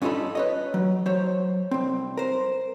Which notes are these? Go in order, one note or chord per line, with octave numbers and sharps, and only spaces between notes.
G2 C#4 D#4 F4 A4 B5
B4 C#5 D#5
F#3
F#3 C5 C#5
C2 C4
A#4 C5